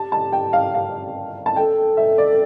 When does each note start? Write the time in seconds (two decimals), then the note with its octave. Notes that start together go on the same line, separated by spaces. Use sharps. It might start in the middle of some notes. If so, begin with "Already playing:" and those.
Already playing: G4 A5
0.12 A5
0.32 G5
0.53 F5
0.74 F5
1.46 A5
1.56 A4 G5
1.97 E5
2.18 D5